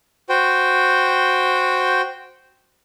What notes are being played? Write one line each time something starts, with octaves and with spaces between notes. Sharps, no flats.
F#4 C5 G5